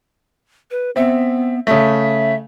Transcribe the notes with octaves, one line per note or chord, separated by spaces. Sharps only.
B4
B3 C4 E5
C#3 A3 E5